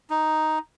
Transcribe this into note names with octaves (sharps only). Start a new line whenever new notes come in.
D#4